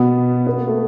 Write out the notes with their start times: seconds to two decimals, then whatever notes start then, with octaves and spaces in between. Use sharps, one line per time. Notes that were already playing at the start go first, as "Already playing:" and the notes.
Already playing: B2 B3
0.47 B3
0.57 A#3
0.68 A3